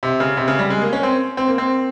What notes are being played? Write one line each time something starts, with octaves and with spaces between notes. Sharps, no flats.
C3
C#3
C3
C#3
G3
G#3
A#3
C#4
C4
C4
A#3
C4